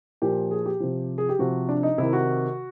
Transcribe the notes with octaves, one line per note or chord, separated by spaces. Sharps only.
A#2 F3 G4
G#4
G4
C3 F3
G#4
G4
C3 F3 F#4
D4
D#4
C3 D#3 E4
F#4